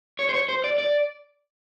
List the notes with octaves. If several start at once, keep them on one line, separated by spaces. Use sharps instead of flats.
C#5
C5
C#5
C5
D5
D5